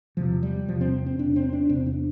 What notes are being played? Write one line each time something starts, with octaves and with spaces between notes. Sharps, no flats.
E2 C3 F3
G3
E2 C3 F3
C4
C4
E2 C3 D4
C4
D4
E2 C3 C4
D4